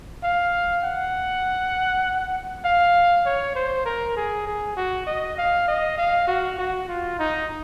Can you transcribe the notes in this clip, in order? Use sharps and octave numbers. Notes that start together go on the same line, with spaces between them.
F5
F#5
F5
C#5
C5
A#4
G#4
G#4
F#4
D#5
F5
D#5
F5
F#4
F#4
F4
D#4